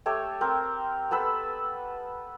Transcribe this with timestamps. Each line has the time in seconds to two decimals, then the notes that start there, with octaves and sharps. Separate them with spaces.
0.06 A3 G4 A4 C#5
0.41 C4 A#4
1.11 B3 A4 B4 E6